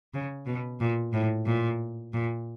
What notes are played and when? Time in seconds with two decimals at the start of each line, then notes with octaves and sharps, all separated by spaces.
0.14 C#3
0.46 B2
0.80 A#2
1.13 A2
1.46 A#2
2.13 A#2